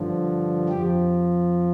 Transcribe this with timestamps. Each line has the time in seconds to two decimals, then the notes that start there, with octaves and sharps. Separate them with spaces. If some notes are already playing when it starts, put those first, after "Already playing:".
Already playing: G2 D3 F3
0.69 F2 F3 G4